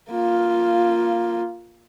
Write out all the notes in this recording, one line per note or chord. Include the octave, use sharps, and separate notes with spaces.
A#3 F4